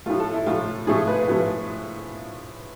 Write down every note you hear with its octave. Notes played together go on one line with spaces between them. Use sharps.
A2 F3 A3 F4
A4
E4
A2 F3 A3 F4
A2 F3 A3 G#4
B4
A2 F3 A3 B4